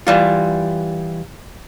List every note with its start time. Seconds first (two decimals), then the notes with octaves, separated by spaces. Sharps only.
0.07 E3 G3 F4